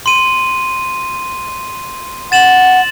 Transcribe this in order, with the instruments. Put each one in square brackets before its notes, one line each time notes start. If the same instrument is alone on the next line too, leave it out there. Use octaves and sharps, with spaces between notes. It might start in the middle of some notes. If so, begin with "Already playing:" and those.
[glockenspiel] C6 D#7
[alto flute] F#5 [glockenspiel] A6 E7 F#7